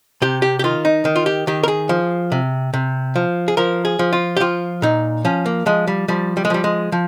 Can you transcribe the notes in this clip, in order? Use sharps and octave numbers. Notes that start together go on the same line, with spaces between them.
C3 G4
G4
G4
D#3 F4
D#4
D#3
F4
G4
D#3 G4
A#4
G#4
F3
C3
C3
F3
G#4
F3 A#4
G#4
F3
F4
G4
F3 F4
A#2 D#4
F3 C#4
A#3
F3 G#3
G3
F3 G3
G3
G#3
F3 G3
G#3
F3